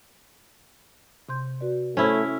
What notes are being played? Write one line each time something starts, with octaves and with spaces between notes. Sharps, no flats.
C3 C6 G6
F#4 B4 D5
A3 C#4 E4 C5 C#5